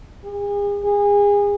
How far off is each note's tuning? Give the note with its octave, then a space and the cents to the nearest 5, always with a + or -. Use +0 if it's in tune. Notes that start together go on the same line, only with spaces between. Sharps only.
G#4 -40
G#4 -30